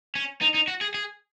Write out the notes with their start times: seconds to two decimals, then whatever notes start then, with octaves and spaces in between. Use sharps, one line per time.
0.15 C#4
0.41 D#4
0.54 D#4
0.68 F#4
0.81 G#4
0.94 G#4